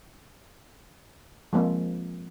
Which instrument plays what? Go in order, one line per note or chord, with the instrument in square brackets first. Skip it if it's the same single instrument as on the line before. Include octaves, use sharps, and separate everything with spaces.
[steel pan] F3 G#3 A#3 C4